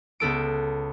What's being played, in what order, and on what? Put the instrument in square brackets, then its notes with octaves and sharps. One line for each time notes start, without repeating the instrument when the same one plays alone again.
[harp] C#2 B3 A4 D7